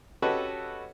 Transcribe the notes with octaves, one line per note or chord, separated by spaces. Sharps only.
C#4 F#4 G4 A4 B4 D#5